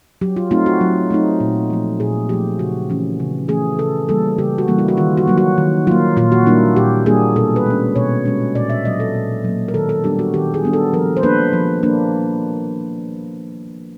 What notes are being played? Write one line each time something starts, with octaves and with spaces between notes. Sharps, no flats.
F#3 G4
F4
A3 C4 D#4 F4
F#4
F#3
A3 C4 D#4
A#2
F3 A3
A#2 G#4
F3 A3 G4
C#3 F#4
E3 A3 C#4
C#3
E3 A3 C#4 G#4
C#3 A4
E3 G3 A#3 A4
C#3 G4
F#4
E3 G3 A#3
E4
F#4
D#3 F4
F#4
F#3 A#3
F#4
D#3
F#3 A#3 F4
A#2 F4
F#4
G3 A#3 D4 E4
A#2 G4
G3 A#3 D4 G#4
B2 A4
B4
G#3 C#4
B2 C#5
G#3 C#4
A#2 D5
E5
F#3 A#3 D#5
A4
A#2
F#3 A#3
A#4
D#3 A4
A4
G3 B3 D4 G4
F#4
D#3 G4
G#4
G3 B3 D4
A4
F3 A#4
C5
A#3 D4 B4
F3
A#3 D4